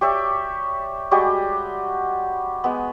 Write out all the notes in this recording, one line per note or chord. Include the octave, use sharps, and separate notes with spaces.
G4 C#5 D5 E5
G3 G#3 F#4 G4
G#3 B3